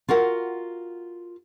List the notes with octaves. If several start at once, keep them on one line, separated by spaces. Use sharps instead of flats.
F4 F#4 A#4 F#5